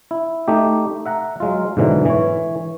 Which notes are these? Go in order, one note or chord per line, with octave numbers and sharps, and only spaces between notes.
E4
A3 D#4 G4
E5 F#5 A#5
F#3 G#3 F4
G#2 B2 D3 E3 F#3
E3 C#5